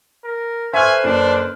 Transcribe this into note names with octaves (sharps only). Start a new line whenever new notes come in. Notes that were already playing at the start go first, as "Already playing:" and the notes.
A#4
A4 B4 C5 E5 G#5 C#6 F6
F#1 D4